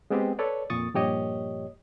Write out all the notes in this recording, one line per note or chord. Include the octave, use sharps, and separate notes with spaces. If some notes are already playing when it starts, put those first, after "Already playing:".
G#3 B3 C4 G4 B4 C5
A4 B4 C#5 D5
F2 A#2 C#6 D#6 A6
G2 A#2 F3 G4 C#5 D#5